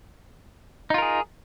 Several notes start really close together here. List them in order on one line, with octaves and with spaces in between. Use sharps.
D#4 F4 A#4 G#4